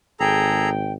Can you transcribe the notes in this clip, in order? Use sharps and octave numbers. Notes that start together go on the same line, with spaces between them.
G#1 G#4 A4 G5 A#5